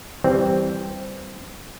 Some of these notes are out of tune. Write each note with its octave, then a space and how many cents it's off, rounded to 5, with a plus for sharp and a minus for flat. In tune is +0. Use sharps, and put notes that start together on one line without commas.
E3 +0 G3 +0 C4 +0